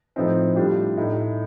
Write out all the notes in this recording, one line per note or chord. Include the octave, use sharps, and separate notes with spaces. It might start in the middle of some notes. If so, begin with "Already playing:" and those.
A2 F3 C4 D#4
A2 G3 D4 F4
A2 A3 D#4